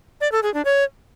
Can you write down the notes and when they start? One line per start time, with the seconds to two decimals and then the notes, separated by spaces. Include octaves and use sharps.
0.21 D5
0.32 A4
0.43 G#4
0.54 D4
0.65 C#5